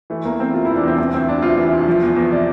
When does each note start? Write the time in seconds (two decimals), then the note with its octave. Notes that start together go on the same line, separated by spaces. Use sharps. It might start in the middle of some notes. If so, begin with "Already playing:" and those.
0.10 E3 A3
0.25 E2 A#3
0.39 E2 C4
0.54 C3 F4
0.65 E4
0.70 E3
0.76 D4
0.83 E2 C4
0.98 E3 C4
1.13 D2 C4
1.28 D2 D4
1.42 C3 F4
1.57 E3
1.73 D2
1.88 F3
2.02 E2
2.16 E2
2.32 C3 D5